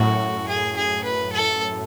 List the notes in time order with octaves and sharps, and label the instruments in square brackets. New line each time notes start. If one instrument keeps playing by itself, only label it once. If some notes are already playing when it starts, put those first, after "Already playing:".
Already playing: [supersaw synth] F#2 A2 [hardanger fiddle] F#4
[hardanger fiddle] G#4
G#4
B4
A4